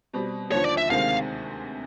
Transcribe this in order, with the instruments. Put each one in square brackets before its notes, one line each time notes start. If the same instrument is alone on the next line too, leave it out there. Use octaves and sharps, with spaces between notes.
[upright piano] B2 G3 C4
[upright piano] D#2 D3 F3 [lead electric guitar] C#5
[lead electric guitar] D5
E5
[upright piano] D2 C3 D#3 G#3 C4 [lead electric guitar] F5